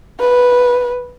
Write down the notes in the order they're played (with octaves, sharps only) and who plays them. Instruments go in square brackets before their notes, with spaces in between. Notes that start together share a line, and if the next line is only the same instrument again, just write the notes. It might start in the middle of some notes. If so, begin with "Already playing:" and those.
[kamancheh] B4